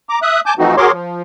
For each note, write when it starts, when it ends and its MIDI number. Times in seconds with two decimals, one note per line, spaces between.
0.09 0.19 82
0.09 0.19 86
0.22 0.41 76
0.22 0.41 87
0.22 0.41 90
0.46 0.54 80
0.46 0.54 81
0.46 0.54 86
0.46 0.54 91
0.59 0.75 52
0.59 0.75 53
0.59 0.75 57
0.59 0.75 60
0.59 0.75 63
0.59 0.75 66
0.77 0.92 66
0.77 0.92 68
0.77 0.92 70
0.77 0.92 73
0.77 0.92 84
0.77 0.92 86
0.92 1.22 53